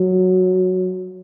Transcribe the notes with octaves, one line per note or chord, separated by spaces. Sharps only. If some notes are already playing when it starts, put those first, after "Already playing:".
Already playing: F#3